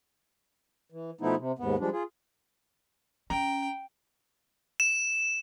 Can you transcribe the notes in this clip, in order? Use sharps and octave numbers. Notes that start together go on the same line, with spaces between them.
E3
B2 F3 A3 B3 D#4 E4
C3
D#2 G#2 B3
F3 G3 G#3 D4
F4 G#4
C#4 G5 A#5
E7